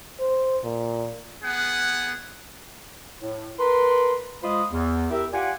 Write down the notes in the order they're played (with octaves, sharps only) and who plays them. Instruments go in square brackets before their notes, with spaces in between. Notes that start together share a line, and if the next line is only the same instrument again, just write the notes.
[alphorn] C5
A#2
[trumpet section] B3 G#4 F#5
[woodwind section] A2
A#4 B4 C6
G#3 F4 C5 D#5 B5 D#6
E2
E4 G4 A#4 E5
F4 G4 D5 F#5 G#5